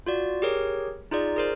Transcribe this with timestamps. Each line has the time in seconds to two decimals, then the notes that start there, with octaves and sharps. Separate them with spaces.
0.07 F4 F#4 D5
0.42 G4 G#4 A#4 C#5
1.11 D#4 F4 G#4 D5
1.36 G#4 A#4 C5